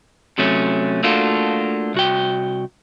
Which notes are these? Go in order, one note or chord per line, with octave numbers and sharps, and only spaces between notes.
C3 F#3 A3 C#4
A3 A#3 D4 F4 F#4 A4
C2 F#4 G5